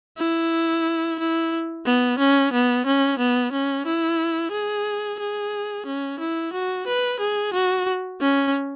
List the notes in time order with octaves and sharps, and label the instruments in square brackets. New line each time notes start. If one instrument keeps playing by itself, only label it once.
[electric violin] E4
E4
B3
C#4
B3
C#4
B3
C#4
E4
G#4
G#4
C#4
E4
F#4
B4
G#4
F#4
C#4